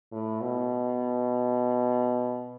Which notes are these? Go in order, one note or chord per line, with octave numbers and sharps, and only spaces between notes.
A2
B2